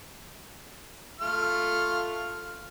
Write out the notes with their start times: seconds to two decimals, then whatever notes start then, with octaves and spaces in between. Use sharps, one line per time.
1.21 A3 F4 F6